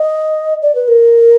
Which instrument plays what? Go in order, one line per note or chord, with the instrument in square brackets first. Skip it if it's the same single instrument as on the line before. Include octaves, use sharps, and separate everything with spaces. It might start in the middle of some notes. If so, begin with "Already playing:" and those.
Already playing: [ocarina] D#5
D5
B4
A#4